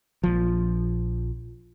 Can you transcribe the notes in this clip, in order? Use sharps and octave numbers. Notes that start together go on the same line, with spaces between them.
A#1 F3